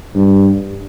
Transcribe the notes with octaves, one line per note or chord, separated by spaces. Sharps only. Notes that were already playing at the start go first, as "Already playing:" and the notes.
G2